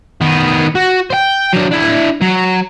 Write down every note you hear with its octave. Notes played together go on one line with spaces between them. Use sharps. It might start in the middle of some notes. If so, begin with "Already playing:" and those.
D#3 B3
F#4
C5 G5
F#3 D4
D4 E4
F#3